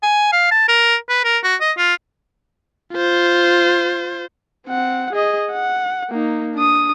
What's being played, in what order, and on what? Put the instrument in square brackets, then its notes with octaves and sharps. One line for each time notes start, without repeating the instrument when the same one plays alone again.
[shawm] G#5
F5
A5
A#4
B4
A#4
F#4
D#5
F4
[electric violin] F4 C5
C4 F#5
G#4 D#5
F#5
A#3 D#4
D4 D#6